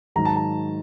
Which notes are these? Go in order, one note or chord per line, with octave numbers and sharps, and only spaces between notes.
G#2 D#3 F#3 A#5
A5
A#5